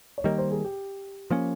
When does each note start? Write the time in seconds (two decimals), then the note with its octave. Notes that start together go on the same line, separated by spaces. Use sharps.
0.18 C#5
0.24 D#3 G3 A#3 D#5
0.38 C5
0.51 G#4
0.64 G4
1.30 F3 A#3 C#4